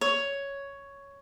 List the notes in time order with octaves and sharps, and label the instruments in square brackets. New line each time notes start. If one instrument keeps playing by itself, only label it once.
[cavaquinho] C#5